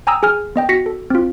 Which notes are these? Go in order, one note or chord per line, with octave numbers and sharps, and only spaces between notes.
G5 G#5 A#5 D#6 E6
G#4 G#5 F6
B3 D#5 G5
F#4 A#6 B6 C#7
A4
C4 F4